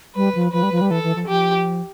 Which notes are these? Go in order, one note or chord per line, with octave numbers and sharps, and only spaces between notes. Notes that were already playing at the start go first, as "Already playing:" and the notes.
G3 B4
F3
F3 B4
G3
F3
G3
E3 A4
E3
F3
F3 G4